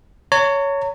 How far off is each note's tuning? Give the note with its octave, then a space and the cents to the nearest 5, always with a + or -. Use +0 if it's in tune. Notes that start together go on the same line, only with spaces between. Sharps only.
C#5 +10 A#5 -40